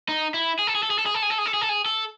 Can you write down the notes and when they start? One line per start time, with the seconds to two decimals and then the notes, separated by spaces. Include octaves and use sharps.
0.09 D#4
0.34 E4
0.59 G#4
0.67 A4
0.75 G#4
0.83 A4
0.90 G#4
0.99 A4
1.06 G#4
1.14 A4
1.22 G#4
1.30 A4
1.38 G#4
1.46 A4
1.54 G#4
1.61 A4
1.69 G#4
1.86 A4